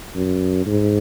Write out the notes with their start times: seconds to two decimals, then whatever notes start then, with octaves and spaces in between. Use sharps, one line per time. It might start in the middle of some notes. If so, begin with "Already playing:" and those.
0.15 F#2
0.66 G#2